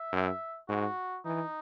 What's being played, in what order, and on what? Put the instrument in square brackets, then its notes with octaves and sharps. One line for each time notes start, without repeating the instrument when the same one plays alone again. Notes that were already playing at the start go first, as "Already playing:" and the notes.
Already playing: [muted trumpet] E5
[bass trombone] F#2
[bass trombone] G#2 [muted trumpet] F#4
[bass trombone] E3 [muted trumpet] D#4